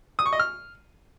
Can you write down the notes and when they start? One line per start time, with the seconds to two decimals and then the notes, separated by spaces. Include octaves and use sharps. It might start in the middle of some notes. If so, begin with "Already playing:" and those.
0.19 D#6
0.26 C#6
0.33 D#5
0.39 F6